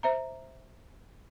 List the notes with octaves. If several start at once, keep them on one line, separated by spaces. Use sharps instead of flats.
C5 E5 A#5